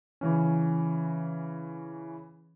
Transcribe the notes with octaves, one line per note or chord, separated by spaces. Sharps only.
C#3 E3 C#4